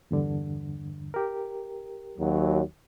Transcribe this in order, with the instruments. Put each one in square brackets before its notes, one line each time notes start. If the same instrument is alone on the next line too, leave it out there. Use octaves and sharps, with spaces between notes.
[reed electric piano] E2 G2 D3
G4 A#4
[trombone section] D#2 F#3